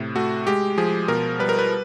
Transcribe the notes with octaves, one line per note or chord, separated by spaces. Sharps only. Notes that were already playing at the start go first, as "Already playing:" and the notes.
Already playing: A2 C3
A3 F#4
G#3 G4
F3 G#4
B2 A#4
G3 B4
A#4
B4